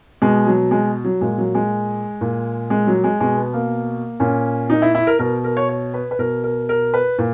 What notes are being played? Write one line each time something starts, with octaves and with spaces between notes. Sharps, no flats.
B2 G#3
F#3
G#3
F#3
A#2 G#3
F#3
G#3
A#2
G#3
F#3
G#3
B2 G#3
B3
A#3
A#2 C#4
D#4
E4
E4
A#4
B2 A#4
A#4
C#5
C#5
B4
B4
B2 A#4
A#4
A#4
B4
A#2